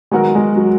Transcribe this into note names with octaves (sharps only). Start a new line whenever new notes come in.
D#3 F#3 G#3 B3 F#4 A#4
G#3
F#3